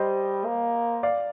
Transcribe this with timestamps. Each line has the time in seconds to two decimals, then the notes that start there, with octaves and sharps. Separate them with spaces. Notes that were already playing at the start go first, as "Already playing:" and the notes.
Already playing: G3 C5 D#5
0.45 A#3
1.03 D5 F5